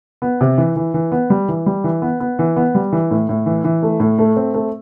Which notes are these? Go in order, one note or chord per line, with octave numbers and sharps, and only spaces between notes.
B3
C3
E3
E3
E3
B3
G3
E3
G3
E3
B3
B3
E3
B3
G3
E3
A2
A2
E3
E3
A3
A2
A3
C4
A3